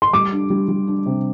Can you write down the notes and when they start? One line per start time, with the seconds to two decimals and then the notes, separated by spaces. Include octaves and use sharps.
0.02 C6
0.13 G3 D6
0.32 D4
0.50 G3
0.68 G3
0.87 D4
1.06 C3